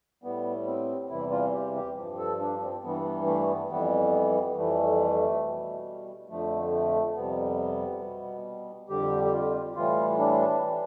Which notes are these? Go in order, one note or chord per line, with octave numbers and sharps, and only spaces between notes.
A2 G3 B3
C4
E2 C3 E3 G3 E4
F4
G4
G4
G2 F3
A4
D4
C4
G2 E3 G3 B3
B3
A3
B3
F2 E3 G3 B3
F2 E3 G3 A3
B2 G3
F2 D3 F3 A3
A3
F2 C3 G3 B3
B2 G3
F2 D3 G3 G4
G4
F4
A2 E3 G3 F4
D4
E3 G3